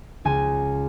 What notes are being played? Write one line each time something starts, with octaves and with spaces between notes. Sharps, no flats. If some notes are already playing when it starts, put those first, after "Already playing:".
C#2 G#5